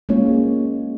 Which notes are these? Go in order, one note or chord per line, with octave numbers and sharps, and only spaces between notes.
G#3 A#3 C#4 F4 C#5